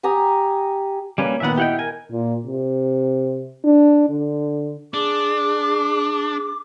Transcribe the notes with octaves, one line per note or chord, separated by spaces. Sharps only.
G4 G#5 A#5 D#6
G3 A#3 C#4 B4
A#2 D#3 B3 E5 F#5
E4 G4 D#5 F#5 G5
A#4 G#5
A#2
C3
D4
D3
D4 G#4 D6